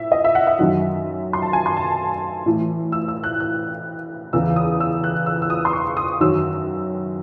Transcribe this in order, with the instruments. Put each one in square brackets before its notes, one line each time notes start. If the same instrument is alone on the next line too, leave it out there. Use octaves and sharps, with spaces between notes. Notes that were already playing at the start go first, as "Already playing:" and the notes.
Already playing: [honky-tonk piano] A2 E5
D#5
E5
F#5
E5
F#2 D#3 F#3 E5
C6
A5
G#5
C6
A5
A2 E3
E6
E6
F#6
F#6
E2 C#3 E3 E6
D#6
E6
F#6
E6
E6
D#6
C6
C#6
D#6
F#2 D#3 F#3 E6